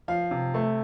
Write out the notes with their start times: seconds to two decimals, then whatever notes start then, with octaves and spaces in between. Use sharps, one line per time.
0.08 F3 F5
0.31 C3
0.54 A3